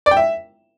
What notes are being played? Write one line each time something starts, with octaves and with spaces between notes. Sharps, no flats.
D5
G5
E5